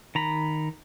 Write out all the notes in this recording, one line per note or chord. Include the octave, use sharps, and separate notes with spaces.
D#3 A#5 B5